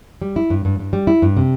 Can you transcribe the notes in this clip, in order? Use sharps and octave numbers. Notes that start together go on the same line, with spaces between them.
G3
E4
G2
G2
G2
G3
E4
G2
C3